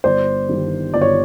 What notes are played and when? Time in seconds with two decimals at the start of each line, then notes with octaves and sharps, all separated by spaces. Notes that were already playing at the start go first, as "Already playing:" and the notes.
0.04 G1 C5 D5
0.49 G2 D#3 G3
0.94 G1 D5
1.02 C#5